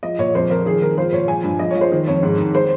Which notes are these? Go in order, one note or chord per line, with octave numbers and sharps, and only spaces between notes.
F3 D#5
A#2 C#5
F2 C5
F2 A#4
D#3 G#4
D#3 A#4
F3 C5
A#2 C#5
F3 G#5
G2
F3 D#5
C#5
F3
C5
D#3
F2 C#5
G#2
D#3
C5